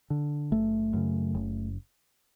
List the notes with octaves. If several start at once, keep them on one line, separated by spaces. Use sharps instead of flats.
D3
F#1 A3
F#2 C#3
F#1